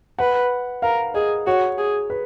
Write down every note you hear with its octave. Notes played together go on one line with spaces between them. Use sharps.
B4 F#5
A#4 F5
G#4 D#5
F#4 C#5
G#4
B4